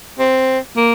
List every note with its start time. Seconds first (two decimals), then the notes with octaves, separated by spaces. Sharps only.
0.19 C4
0.77 A#3